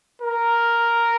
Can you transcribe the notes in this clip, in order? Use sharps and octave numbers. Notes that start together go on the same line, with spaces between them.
A#4